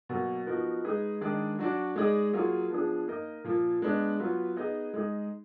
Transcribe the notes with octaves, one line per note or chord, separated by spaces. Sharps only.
B2 F#3 A#3
F3 B3 D#4 F#4 A#4
G#3 D#4 G#4 B4
D#3 G#3 D4 G#4 D5
F#3 D4 F#4 D5
G#3 D#4 G#4 D5
F#3 A#3 F4 G#4
F3 B3 D4 G#4
A#3 D#4 A#4 D#5
A#2 F3 A#3
G#3 B3 D4
F#3 B3 F4 B4
B3 D#4 G#4 D#5
G#3 D#4 G#4 D#5